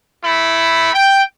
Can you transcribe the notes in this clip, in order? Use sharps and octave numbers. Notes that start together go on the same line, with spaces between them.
A3 E4 B5
G5